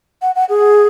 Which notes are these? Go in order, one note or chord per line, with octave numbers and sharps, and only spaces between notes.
F#5
F#5
G#4